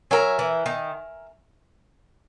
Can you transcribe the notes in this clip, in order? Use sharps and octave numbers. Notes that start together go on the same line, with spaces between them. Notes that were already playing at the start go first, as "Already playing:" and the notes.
F#3 A#4 E5 G#5
E3
D#3